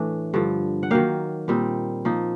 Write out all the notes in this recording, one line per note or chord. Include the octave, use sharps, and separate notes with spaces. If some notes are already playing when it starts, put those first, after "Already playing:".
Already playing: A2 E3 A3 D4
G2 D3 F3
F#5
D#3 F#3 A#3 F5 G5
A#2 G3 C4 D#4
F3 A#3 D#4